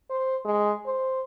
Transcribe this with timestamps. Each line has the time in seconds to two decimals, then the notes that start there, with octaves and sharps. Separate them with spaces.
0.10 C5
0.45 G#3
0.86 C5